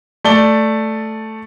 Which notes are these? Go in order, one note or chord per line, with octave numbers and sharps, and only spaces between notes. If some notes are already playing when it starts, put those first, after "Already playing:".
A3 D5 G7